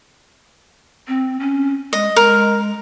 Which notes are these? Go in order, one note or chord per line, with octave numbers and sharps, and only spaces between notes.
C4
C#4
G#3 D#5
G#3 A#4